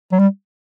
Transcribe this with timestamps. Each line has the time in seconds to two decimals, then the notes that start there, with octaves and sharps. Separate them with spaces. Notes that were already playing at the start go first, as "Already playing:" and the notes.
0.12 F#3
0.19 G3